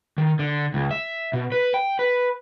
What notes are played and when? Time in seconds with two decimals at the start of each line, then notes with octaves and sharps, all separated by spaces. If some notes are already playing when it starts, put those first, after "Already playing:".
0.18 D#3
0.39 D3
0.74 C#2
0.91 E5
1.33 B2
1.52 B4
1.74 G5
1.99 B4